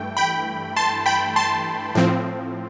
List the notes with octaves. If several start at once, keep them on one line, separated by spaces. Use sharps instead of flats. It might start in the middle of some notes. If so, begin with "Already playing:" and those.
Already playing: G2 E3 A3 G5
G5 B5
A5 C6
G5 B5
A5 C6
A2 F3 C4